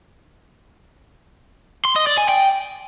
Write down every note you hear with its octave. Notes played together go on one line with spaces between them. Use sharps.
C6
D#5
D5
G#5
G5